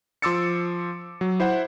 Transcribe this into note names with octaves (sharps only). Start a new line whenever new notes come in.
F3 C6 D6 E6 A6 C#7
F#3
E4 C5 E5 F#5